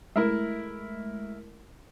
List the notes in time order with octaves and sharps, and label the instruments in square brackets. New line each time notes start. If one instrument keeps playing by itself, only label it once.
[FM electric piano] G#3 A3 [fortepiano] E4 A#4 E5